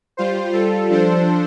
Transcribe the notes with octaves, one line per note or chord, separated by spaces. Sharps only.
G3 F4 C5
G3 F4 A4
F3 D4 A4 C5